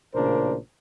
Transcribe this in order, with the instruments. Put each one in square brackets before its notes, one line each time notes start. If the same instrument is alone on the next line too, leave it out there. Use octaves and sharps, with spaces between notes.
[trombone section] A1 A#2 C#3 D4 A#4 C5